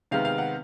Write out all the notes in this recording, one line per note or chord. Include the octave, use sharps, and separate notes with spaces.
C3 D#3 G#3 B3 F5
F5
F#5